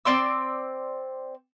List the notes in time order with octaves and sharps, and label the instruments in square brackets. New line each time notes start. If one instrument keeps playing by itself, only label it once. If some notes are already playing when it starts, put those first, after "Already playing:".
[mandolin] C4 D5 C6 E6